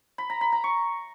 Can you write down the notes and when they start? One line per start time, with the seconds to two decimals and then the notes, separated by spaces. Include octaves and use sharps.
0.18 B5
0.30 A#5
0.41 B5
0.52 A#5
0.64 C#6